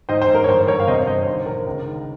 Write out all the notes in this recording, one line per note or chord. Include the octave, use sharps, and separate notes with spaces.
G#2 C5 D#5
C5
G#2
A#4
C#5
G1 C5
G1 A#4 C#5
F5
C3 C5 D#5
C#5
G1 C5 D#5
C#5
D#3 C5
C5
A#1 A#4
C#2
D#3